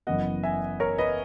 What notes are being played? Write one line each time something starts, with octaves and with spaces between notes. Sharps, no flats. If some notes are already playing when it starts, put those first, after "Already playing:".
F#1 F#2 E3 B3 D#5 F#5
E5 G#5
A#4 C#5
B4 D#5